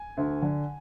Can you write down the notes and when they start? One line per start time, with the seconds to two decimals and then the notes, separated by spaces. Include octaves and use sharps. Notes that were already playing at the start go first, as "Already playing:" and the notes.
Already playing: G#5
0.17 D2
0.42 D3